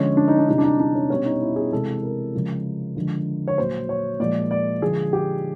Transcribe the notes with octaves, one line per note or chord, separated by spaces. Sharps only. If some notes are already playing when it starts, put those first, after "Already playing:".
Already playing: D3 F3 G#3 C#4
D4
D#4
D4
C3 E3 G3 D#4
D4
D#4
D4
C#4
B2 G3 C#4
D#4
E4
G#4
C3 E3 G#3 A4
A#4
C#3 F3 G#3
D3 F3 G#3
C#5
A#2 F#3 C5
C#5
A#2 F3 G#3 D5
D5
D3 F3 G#3 G#4
G4